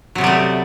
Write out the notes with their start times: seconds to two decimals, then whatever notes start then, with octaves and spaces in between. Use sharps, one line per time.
0.15 F#3
0.18 C3
0.21 B3
0.24 G3
0.26 A3